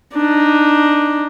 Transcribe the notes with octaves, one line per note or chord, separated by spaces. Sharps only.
D4 D#4